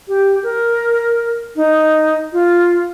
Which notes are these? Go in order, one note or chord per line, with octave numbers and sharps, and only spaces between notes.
G4
A#4
D#4
F4